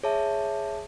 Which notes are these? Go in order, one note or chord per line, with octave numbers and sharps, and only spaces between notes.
G#4 C#5 E5 A5